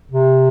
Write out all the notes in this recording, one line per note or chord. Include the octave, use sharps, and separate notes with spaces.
C3